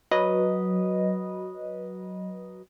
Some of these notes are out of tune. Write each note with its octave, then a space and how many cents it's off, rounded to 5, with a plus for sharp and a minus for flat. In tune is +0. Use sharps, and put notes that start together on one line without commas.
F#3 +0 B4 -15 D#5 -5